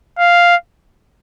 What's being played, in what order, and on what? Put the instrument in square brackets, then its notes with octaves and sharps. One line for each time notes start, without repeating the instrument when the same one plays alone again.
[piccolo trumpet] F5